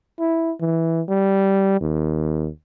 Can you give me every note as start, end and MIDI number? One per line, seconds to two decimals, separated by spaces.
0.20 0.52 64
0.60 1.01 52
1.09 1.79 55
1.81 2.49 39